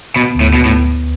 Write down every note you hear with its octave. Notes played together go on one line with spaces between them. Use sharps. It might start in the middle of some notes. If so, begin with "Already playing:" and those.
B2 B3
D2
A2
B2 B3
A2